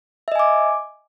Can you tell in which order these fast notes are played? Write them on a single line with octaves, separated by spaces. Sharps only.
E5 D#5 G#5 D6